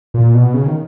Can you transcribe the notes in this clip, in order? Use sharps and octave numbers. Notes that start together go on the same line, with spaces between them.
A#2
B2
C#3
D#3